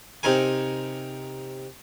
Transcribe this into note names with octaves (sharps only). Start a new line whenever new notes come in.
C3 C4 D#4 A#4 G#5